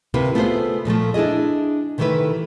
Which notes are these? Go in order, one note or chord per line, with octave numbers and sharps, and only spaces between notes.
D2 C3 A#3 E4 B4
A3 B3 F4 F#4 G#4 C5
A#2 F3 G#3 A3
D4 E4 F4 G#4 D#5
C3 D#3 E3 A3 E4 B4